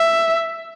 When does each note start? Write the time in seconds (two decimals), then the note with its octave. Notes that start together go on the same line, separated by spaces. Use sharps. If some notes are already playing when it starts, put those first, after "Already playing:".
Already playing: E5